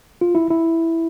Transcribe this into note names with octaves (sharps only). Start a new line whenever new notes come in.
F4
E4
E4